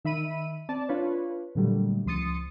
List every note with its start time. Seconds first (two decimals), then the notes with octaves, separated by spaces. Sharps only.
0.05 D#3 E5 B5 D#7
0.69 C4 D5 A5
0.89 D4 F4 B4 C#5
1.55 A#2 D3 F#3 G3 A3
2.06 C#2 F3 C6 D#6 A6 C#7